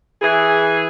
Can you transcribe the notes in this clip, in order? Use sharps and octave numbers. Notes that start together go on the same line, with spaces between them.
E3 G#4